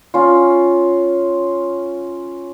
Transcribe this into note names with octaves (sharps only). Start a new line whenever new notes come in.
C#4 F4